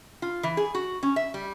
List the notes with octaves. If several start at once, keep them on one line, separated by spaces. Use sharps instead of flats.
F4
E3
G#4
F#4
C#4
E5
G3